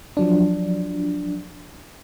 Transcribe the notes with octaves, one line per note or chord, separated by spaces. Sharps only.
F3 F#3 D4